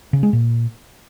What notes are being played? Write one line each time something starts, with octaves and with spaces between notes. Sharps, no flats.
C#3
G#3
A#2